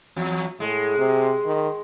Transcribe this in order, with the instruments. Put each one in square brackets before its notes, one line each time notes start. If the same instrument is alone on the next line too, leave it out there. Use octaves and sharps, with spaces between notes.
[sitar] E2 [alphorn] F#3
[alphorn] A2 [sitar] G#3
[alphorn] C3
D#3